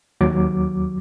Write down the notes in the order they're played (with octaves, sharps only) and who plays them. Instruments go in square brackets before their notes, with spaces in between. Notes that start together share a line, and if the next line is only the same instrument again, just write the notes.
[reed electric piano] D#2 F#3 D6